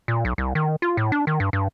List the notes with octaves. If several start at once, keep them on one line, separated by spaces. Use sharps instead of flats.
A#2
B1
C2
D#3
F4
A2
D4
D#3
G2
G2